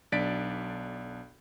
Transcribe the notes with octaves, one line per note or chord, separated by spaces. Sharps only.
B1 D4 D5 A6 B6 D7